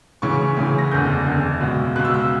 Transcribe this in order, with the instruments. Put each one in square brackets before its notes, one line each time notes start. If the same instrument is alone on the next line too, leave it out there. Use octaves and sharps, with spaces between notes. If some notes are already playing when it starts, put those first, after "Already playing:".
[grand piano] D2 C#3 E3 C#6
D2 C#3 E3
A#6
F#1 E2 D3 G6
F#1 E2 D3
C#2 B2
C#2 B2 F#6
E6
F#6